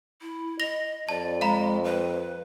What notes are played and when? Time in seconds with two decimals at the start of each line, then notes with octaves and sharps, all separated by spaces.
0.22 E4
0.60 D#5 A#6 F7 G7
1.09 F2 D5 A5
1.41 G#3 F5 A#5 B5
1.84 B4